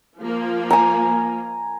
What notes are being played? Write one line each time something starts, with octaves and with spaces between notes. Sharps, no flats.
F3 A#3
G#5 A#5